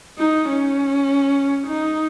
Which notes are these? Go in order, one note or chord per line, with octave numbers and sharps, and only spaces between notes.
D#4
C#4
D#4